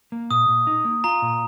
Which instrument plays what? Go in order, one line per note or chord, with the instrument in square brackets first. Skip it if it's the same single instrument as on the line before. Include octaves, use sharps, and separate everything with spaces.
[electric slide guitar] A#3
[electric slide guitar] A#2 [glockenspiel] D#6
[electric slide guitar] A#2
D#4
A#3
[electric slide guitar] F4 [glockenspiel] A#5
[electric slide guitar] A#2